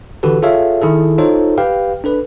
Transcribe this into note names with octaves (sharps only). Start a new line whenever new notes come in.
D3 E3 F#4 G4 A4 B4
F4 G#4 A4 C#5 E5 F5
D#3 E4 G#4 A4
D#4 F4 A4 C5 C#5
G4 B4 F5 G5
D4 A4 B4